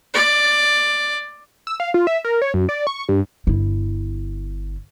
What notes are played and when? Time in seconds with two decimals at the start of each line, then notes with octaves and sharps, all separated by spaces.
0.14 D5
1.67 E6
1.80 F5
1.94 F4
2.07 E5
2.25 A#4
2.42 C#5
2.54 F#2
2.69 D5
2.87 C#6
3.09 G2
3.47 G1 E4